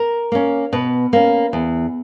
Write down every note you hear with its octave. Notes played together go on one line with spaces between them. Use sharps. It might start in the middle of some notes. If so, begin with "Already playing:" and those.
Already playing: A#4
A#3 C#4
B2 B4
A#3 C#4
E2